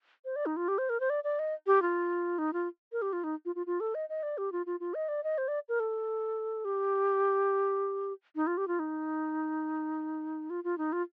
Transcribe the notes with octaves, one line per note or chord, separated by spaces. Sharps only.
C5
D5
D#4
F4
G4
C5
A#4
C5
D5
D5
D#5
G4
F4
D#4
F4
A#4
G4
F4
D#4
F4
F4
F4
A4
D#5
D#5
D5
G4
F4
F4
F4
D#5
D5
D#5
C5
D5
A#4
A4
G4
D#4
F4
G4
F4
D#4
F4
F4
D#4
F4